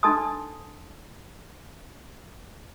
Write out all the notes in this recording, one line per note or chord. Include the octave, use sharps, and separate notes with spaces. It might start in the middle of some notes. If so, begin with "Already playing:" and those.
D4 D#4 A4 A5 C6 D#6